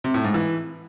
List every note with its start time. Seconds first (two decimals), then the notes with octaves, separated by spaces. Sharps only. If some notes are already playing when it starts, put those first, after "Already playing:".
0.04 C3
0.14 A2
0.24 G#2
0.34 E3